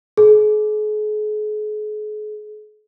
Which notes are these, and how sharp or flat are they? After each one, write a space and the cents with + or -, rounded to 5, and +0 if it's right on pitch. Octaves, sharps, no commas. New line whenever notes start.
G#4 +40